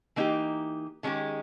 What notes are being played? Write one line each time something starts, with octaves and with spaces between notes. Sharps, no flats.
E3 A#3 D#4 G4
D#3 G#3 C#4 G4